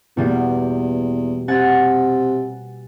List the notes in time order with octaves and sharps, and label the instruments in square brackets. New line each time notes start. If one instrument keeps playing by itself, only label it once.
[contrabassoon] E2 [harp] B2 G3 A#3
[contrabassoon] C3 [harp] F#5 G#5 A6